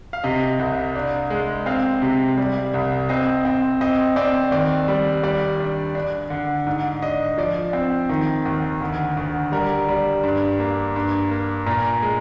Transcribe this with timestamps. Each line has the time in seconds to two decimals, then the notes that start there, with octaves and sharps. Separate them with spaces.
0.13 F5
0.24 C3 D#5
0.59 C2
0.96 D4
1.30 G#3
1.66 C4 F5
2.02 C3
2.37 G3
2.74 C2
3.09 C4 D#5
3.45 C4
3.81 C4 D#5
4.16 C4 D5
4.52 D#2 D5
4.88 G3
5.23 G3 D5
5.60 D4
5.95 D4
6.30 D3
6.67 G#2
7.02 D4 D#5
7.38 F3 D5
7.73 C4
8.09 D#3
8.46 D#2
8.81 D2
9.17 D2
9.52 G3 A#4
9.88 G3
10.23 G2
10.60 A#3
10.96 G2
11.31 A#3
11.66 A#2 A#4
12.02 G#3